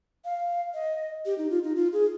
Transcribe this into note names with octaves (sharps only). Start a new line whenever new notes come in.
F5
D#5
G4
D#4
F4
D#4
F4
G#4